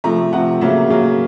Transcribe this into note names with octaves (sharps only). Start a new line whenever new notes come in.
C3 F3 A3 A#5
C3 F3 A3 F#5
C#3 F#3 A#3 E5
C#3 F#3 A#3